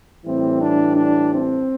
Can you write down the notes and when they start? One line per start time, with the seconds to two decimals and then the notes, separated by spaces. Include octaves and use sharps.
0.24 A2 E3 G3 C4
0.60 D4
0.96 D4
1.32 C4